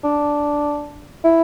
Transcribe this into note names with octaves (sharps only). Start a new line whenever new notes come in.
D4
E4